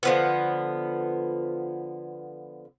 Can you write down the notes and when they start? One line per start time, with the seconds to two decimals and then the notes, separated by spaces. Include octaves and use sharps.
0.03 D3 F3 B3